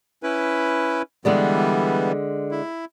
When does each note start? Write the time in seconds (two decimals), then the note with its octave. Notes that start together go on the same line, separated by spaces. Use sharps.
0.23 C#4 E4 B4
1.25 D3 E3 G3 G#3 B3 D5
2.51 E4